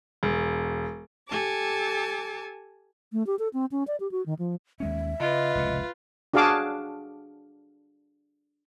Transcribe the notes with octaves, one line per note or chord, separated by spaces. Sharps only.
E1
G4 A4 G#5 A5 D6
A3
G4
A4
C4
C#4
D5
G4
F#4
D#3
F3
D#2 G#3 C#4 E5
C#3 F4 B4 D#5
F1 C#2 A2
D4 F#4 G#4 F5 A5 D6